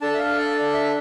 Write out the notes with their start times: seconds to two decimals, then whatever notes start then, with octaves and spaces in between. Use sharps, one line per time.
0.01 D4 A4 A5
0.14 E5
0.19 F5
0.38 D5
0.74 E5